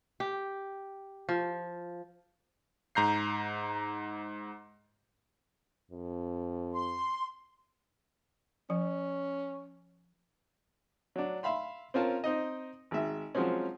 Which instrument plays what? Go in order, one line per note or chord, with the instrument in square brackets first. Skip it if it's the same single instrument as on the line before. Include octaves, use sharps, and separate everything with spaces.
[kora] G4
F3
[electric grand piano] G#2 A#5 G6 C7
[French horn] F2
[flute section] C6
[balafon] F3 [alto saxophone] C#4
[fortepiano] F#3 D4
E5 F5 B5 C6
C4 C#4 F4 A#4 A5
C4 D#4 D#5
G#1 G#3 E5
F3 F#3 G#3 C4 C#4